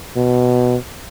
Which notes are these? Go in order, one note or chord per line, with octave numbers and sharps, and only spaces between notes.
B2